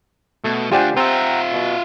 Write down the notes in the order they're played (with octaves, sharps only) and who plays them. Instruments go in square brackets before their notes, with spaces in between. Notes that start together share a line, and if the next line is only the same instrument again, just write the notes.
[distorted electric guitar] B2 [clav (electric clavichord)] A3
[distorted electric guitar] D2 D4 [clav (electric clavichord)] F4 D5 F#5 [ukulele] G4 C5 G#5
[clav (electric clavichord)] C4 [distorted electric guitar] F4 E5 [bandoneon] F#5 G5 A#5
[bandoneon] B2